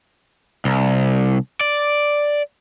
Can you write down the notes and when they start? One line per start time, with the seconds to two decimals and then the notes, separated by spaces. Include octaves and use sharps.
0.65 C2
1.61 D5